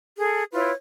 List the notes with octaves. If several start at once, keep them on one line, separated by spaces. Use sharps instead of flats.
G#4 A4
E4 F4 B4 C#5